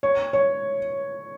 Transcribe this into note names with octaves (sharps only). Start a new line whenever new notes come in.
C#5
C#5